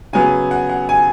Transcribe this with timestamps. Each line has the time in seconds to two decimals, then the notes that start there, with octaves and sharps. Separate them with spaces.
0.13 C#3 F#3 B3 G#5
0.51 F#5
0.70 F#5
0.89 G#5